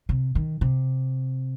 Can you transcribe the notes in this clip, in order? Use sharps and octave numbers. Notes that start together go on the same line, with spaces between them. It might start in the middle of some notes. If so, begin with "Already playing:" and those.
C3
D#3
C3